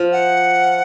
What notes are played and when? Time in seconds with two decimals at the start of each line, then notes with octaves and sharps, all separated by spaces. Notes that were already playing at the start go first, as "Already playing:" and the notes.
Already playing: F3
0.12 F#5